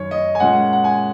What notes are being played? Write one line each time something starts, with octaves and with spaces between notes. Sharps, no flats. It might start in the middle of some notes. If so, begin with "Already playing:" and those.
Already playing: F#2 D#3 C#5
D#5
G#5
A#2 G#3 C#4 F#5
F#5
G#5